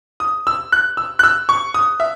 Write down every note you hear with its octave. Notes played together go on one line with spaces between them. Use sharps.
D#6
E6
F#6
E6
F#6
E6
C#6
D#6
E5